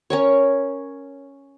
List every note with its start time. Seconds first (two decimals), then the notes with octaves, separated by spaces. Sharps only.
0.10 C#4 A#4 C#5